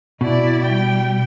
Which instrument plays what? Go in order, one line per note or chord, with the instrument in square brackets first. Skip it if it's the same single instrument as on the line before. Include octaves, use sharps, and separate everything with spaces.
[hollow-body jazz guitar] B2 [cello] E4 D5
[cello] G3 G5